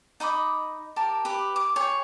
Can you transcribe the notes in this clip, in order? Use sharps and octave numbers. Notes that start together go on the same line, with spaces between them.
D#4 D#5 B5 D6
G4 A#4 A5
G4 B4
D6
G#4 C#5 G5